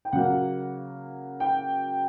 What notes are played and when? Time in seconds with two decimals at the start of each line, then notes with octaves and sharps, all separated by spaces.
0.05 G5
0.12 C#3 F#3 A#3 F#5
1.40 G5